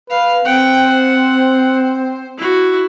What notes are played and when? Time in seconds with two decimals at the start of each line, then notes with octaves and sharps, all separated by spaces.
0.10 B4 F5
0.45 C4 F#5 G5
0.88 C5
2.37 E4 F#4